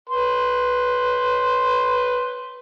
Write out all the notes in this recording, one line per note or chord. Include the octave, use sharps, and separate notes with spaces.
B4 C6